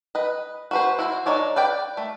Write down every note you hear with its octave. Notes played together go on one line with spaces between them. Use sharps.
B4 D#5
F#4 B4 C5
E4 F#4 C5
D4 D#4 A4 C#5 D5
B4 D5 G5
A3